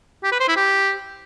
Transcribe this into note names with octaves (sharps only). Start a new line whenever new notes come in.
G4
B4
C5
E4
G4